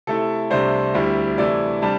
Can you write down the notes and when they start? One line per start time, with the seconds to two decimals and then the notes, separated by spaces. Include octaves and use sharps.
0.07 C3 A3 E4 A4
0.50 C2 C3 A3 D4 C5
0.94 D2 C3 G3 E4
1.38 C3 E3 A3 E4 D5
1.82 C3 G3 D4 A5